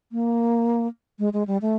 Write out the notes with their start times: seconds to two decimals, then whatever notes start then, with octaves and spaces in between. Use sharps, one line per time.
0.12 A#3
1.19 G#3
1.33 G#3
1.47 G3
1.62 A3